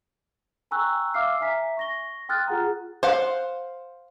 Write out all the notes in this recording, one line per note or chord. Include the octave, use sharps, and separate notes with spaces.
G5 G#5 A#5 C#6 E6 F#6
E5 F5 D6 E6 F6 C7
E5 G#5 A#5 B6
C#6 A#6 G7
G5 C6 D#6 F6 F#6 A6
F4 G#4 F#5 A#5
C5 F5 F#5